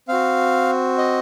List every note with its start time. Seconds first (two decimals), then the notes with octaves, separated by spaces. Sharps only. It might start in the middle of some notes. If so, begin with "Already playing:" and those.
0.08 C4 F#4 F5
0.98 D#5